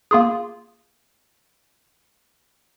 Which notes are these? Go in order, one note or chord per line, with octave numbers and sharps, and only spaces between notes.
A#3 F4 G#4